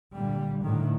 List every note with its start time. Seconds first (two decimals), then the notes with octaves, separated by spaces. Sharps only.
0.13 A#2 D3 G3
0.61 A2 D3 D#3